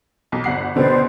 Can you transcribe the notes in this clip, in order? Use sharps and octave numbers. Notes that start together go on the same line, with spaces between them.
B1
G1 F#5 C7
C#2 B2 D3 B4 C5 D5